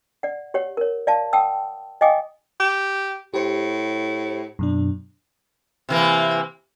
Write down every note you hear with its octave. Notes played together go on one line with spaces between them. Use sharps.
D5 F#5
G4 C#5 F#5
A#4 C#5
D5 F5 A5
F#5 G5 A5 D#6 E6
D#5 F5 G5 G#5 D6 D#6
G4
A2 G4 C5 C#7
F#2 B2 D4
C3 E3 A#3